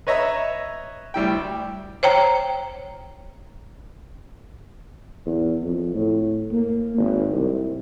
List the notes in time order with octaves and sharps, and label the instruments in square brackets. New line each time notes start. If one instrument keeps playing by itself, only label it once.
[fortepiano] B4 C#5 D#5 E5 A#5
D2 G3 E4 G5
[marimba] C5 C#5 G5 A#5
[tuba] E2
F2
A2
A#3
G#1
C2